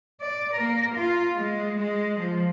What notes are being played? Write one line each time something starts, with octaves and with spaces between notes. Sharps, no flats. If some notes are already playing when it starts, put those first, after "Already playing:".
D5
A#3 A#4
F4
G#3
G#3
F3